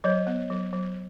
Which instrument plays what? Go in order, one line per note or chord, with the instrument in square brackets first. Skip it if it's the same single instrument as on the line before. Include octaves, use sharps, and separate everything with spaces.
[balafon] F#3 [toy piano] C#5 D#5
[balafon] B3
F#3
F#3